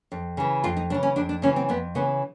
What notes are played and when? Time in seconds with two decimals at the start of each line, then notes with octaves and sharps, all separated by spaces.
0.12 F2
0.37 C#3 E3
0.64 F2 F4
0.77 D#4
0.90 C#3 E3 D4
1.03 C#4
1.16 F2 D4
1.29 D4
1.42 C#3 E3 C#4
1.56 C4
1.69 F2 B3
1.95 C#3 E3 B3